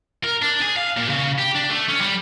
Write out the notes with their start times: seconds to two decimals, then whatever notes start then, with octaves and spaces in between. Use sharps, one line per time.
0.24 A#4
0.42 D4
0.62 G#4
0.76 F5
0.97 A#2
1.09 C#3
1.38 G4
1.55 D4
1.70 A3
1.88 C#4
2.01 G3